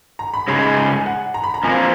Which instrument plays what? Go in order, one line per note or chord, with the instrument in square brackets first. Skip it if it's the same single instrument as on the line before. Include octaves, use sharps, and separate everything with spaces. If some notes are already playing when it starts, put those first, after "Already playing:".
[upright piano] A#5
B5
[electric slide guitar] C#3 G#3 D#4 G#4 [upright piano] B5
[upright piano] B5
B5
G#5
F#5
A#5
B5
A#5
[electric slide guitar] F2 F3 A#3 [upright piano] G#5